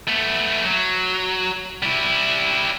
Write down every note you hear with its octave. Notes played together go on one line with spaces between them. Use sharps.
A3 B3
F#3
G3 E4